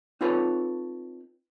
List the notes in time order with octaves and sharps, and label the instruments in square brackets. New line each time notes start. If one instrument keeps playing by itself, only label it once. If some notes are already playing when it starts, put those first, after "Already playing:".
[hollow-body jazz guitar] C4 D#4 F4 A4 B4 C#5